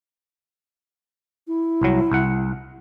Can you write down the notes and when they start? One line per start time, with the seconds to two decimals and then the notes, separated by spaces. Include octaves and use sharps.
1.47 E4
1.81 C2 F#3
2.12 C2 F#5